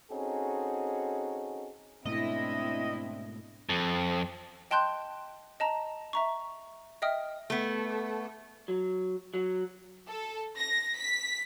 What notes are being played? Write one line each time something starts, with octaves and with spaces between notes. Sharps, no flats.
C4 C#4 D#4 F#4 G#4 A4
G#2 B2 A3 C4 D4 E4 D#5
F2
D#5 G5 A5 C6 F#6 G6
D#5 A5 A#5
E5 A#5 C#6
D#5 E5 G5 D#6 F6
A3 B3
F#3
F#3
A4
A#6
B6